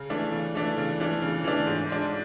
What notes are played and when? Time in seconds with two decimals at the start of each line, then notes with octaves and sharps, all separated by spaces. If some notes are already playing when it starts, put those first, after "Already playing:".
Already playing: C#3
0.10 E3 A3 D4
0.32 C#3
0.55 E3 A3 D4
0.78 C#3
1.00 E3 A3 D4
1.22 C#3
1.44 E3 A3 D4
1.67 G#2
1.89 G#3 D4